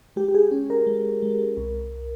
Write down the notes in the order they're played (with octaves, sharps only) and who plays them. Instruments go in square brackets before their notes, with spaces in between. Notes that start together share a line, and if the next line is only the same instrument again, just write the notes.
[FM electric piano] G#3 G4
G4
G#4
C#4
A#4
G#3
G#3
C2